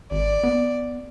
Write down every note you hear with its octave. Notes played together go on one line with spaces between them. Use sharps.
G#1 D5
B3